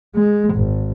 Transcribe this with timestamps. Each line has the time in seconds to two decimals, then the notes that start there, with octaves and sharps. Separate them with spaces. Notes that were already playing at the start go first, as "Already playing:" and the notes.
0.15 G#3
0.55 G#1